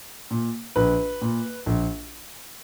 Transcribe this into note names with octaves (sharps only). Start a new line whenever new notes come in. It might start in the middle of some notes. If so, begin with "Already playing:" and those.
A#2
A#1 B4
A#2
A#1